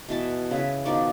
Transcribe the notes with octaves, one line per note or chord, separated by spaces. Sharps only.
B2 E3 A5
C#3 E4 B4
B2 D#3 F3 D5